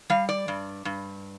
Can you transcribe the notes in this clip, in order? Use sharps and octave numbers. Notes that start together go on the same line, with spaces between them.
G3 F5
D5
G2
G2